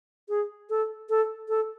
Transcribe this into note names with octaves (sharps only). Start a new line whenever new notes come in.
G#4
A4
A4
A4